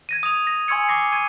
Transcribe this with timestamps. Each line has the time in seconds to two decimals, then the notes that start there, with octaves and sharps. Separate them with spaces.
0.09 G#6 A#6 D#7
0.23 D#6 F7
0.47 A#6
0.68 G#5 C6 C#6 E6 G#6 C#7
0.88 C#6 D6 A#6 C7
1.12 C#6 G#6 D#7